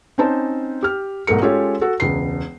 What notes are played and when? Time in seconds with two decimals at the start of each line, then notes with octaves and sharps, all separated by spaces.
0.18 C4 C#4 D#4 C5 A5
0.83 G4 F6
1.27 B1 G#2 A3 A#4 C#7
1.41 G#3 C#4 F4 G4 A4 C#5
1.81 F#4 A4
2.00 E1 C#2 C7